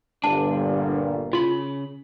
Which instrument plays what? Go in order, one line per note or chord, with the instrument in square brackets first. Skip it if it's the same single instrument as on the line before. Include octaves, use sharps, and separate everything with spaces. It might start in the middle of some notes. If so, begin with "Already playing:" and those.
[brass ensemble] G1 A#2 [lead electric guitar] D4 [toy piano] A5
[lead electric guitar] C#3 B5 [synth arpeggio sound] F4